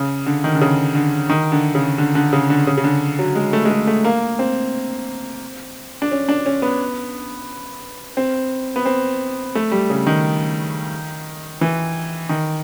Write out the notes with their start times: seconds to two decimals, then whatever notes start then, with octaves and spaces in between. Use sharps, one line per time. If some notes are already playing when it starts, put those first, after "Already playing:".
Already playing: C#3
0.26 D3
0.44 D#3
0.55 D3
0.61 C#3
0.95 D3
1.30 D#3
1.52 D3
1.75 C#3
1.98 D3
2.15 D3
2.33 C#3
2.50 D3
2.67 C#3
2.77 C#3
2.84 D3
3.19 F#3
3.35 G#3
3.53 A3
3.65 G#3
3.70 A3
3.87 A3
4.05 A#3
4.39 C4
6.02 D4
6.12 C#4
6.29 D4
6.46 C#4
6.62 B3
8.17 C4
8.76 B3
8.85 C4
9.55 A3
9.71 G3
9.90 C#3
10.07 D#3
11.61 E3
12.29 D#3